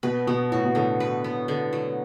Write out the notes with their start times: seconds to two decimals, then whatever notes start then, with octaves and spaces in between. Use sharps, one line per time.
0.03 B2 B4
0.27 B2 B3
0.52 A2 F#4
0.65 B2
0.75 A2 D3
1.00 B4
1.24 B3
1.48 D3
1.73 F#3